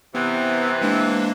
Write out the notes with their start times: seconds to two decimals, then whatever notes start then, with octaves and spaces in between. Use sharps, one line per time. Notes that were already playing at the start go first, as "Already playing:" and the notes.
0.15 C3 E3 B3
0.82 G#3 A#3 D4